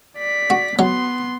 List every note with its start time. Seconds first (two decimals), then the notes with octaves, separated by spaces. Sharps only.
0.17 D5 B6
0.50 F#4
0.79 F#3 B3 C6